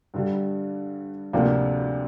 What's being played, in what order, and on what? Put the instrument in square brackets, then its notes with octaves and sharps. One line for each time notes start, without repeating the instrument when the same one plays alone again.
[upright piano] G2 D3 G3
D2 C3 F3 A#3 D4